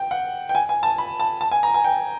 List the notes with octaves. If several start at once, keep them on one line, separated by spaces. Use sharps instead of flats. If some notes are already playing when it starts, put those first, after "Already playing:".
Already playing: G5
F#5
G5
G#5
G#5
A5
B5
A5
A5
G#5
A#5
G#5
G5